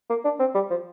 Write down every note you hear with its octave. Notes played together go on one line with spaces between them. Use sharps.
A#3
D4
C4
G3
F3